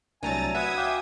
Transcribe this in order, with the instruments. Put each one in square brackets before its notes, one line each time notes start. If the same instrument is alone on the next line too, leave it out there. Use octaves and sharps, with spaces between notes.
[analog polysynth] C2 A#5 A6 [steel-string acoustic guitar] F#3 A3 D4 [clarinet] G#5
[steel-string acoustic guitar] F#4 [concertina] B4 [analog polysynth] E5 D#6 G#6
[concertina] F5 G5 D6